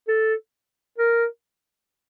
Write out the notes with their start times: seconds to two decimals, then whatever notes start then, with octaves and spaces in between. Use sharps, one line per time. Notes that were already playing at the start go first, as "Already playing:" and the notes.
0.08 A4
0.98 A#4